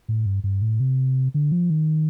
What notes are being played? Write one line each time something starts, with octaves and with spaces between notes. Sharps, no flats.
A2
G2
G2
A2
C3
D3
F3
D#3